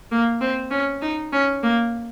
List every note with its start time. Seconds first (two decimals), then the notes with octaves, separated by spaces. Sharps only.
0.11 A#3
0.41 C4
0.71 C#4
1.02 D#4
1.32 C#4
1.63 A#3